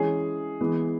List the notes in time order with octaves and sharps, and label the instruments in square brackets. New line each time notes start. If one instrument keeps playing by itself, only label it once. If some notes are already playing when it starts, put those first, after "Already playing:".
Already playing: [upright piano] E3 G#3 C#4 G#4
E3 G#3 B3